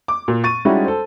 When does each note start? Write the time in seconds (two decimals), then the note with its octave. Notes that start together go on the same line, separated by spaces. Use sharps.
0.08 D6
0.28 A#2
0.44 C#6 A6 D#7
0.65 G3 G#3 C#4 D#4 E4 F#4
0.85 A4 C5